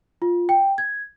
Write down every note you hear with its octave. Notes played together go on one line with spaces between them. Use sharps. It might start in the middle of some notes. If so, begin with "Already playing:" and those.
F4
G5
G#6